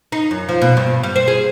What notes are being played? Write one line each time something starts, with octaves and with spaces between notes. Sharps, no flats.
D#4
F#2
F3
B2
G2
G3
C5
G#4